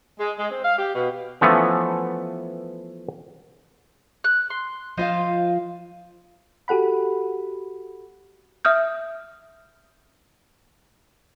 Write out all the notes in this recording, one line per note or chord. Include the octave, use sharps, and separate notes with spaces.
G#3
G#3
C4
F5
G4
B2
E3 F3 A3 B3 C#4
F#6
C6
F3 F4 C5 D#5 F5
F#4 G4 A4 F#5 B5
E5 D#6 F6 G6